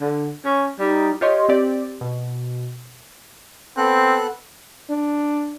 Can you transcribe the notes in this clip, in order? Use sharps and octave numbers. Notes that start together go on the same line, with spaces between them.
D3
C#4
G3 D#4
F4 G4 C#5 D#5 C6
C4 G4 D5
B2
B3 C4 A4 F#6
D4